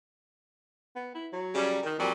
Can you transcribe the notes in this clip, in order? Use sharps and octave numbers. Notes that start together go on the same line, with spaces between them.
B3
E4
F#3
C#3 G3
D#3
F2 A#2 F#3 G3